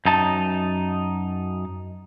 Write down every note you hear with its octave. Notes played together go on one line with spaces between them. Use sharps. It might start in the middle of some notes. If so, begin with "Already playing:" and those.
F#2 D#4 A5